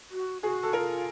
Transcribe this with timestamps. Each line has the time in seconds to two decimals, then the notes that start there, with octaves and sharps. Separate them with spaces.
0.11 F#4
0.42 F#4 G#4
0.63 A4
0.73 F4 A#4